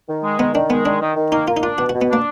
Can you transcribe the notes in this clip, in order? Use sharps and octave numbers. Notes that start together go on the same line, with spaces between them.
D#3
G#3
D#3 B3
D#3 D4
G#3 B3
D#3 D4
D#3
D#3
A#3 D#4
A#3 F4
D#4
D4 F4
B2 F#4
B2 F#4
B3
A#3 D4